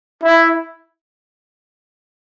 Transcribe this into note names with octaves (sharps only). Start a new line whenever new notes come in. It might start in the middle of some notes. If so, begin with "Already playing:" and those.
E4